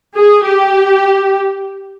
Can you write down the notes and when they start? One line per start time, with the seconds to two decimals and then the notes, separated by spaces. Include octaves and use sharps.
0.16 G#4
0.46 G4